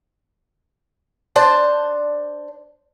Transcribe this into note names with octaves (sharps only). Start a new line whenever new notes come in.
D4 C5 A5